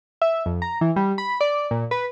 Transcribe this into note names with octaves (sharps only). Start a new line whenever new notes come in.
E5
F2
A#5
E3
G3
B5
D5
A#2
B4